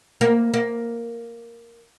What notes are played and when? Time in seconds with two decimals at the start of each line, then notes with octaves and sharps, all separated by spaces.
0.21 A#3
0.54 A#3